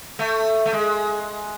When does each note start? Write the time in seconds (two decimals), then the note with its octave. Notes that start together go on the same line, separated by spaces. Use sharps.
0.19 A3
0.66 A3
0.73 G#3